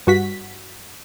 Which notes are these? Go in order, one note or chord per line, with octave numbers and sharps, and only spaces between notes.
G2 F#4 B6